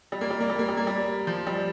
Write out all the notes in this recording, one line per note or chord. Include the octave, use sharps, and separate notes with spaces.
G3
A#3
G3
A#3
G3
A#3
G3
A#3
G3
F3
G3